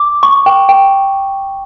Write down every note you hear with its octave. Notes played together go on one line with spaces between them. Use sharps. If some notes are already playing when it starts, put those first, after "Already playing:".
Already playing: D6
C#6
G5
G5